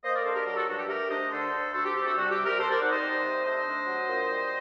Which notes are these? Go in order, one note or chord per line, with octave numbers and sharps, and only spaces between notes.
A#3 C5 D#5
A#4 D5
D4 A4 C5
G4 A#4
F#3 G4 A#4
F#4 A4
G2 F#4
G4
A3 G4 A#4
D4 C5 D#5
D3 A4 C5
D2
D4 F#4 A4
G4
C3 G4
F#4 A4
G3 F#4
G4
C3
G4 A#4
C4 A4 C5
A#4 D5
D#4 D5 F#5
C5 D#5
G3
C3
A3 C5 D#5
D4
F#3
A#2
G3